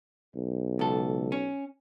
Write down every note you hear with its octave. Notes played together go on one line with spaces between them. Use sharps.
B1
C#2 A4
C#4